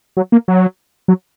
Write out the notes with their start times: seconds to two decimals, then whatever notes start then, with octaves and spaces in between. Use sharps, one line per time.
0.17 F#3
0.32 A#3
0.48 F#3
1.08 F#3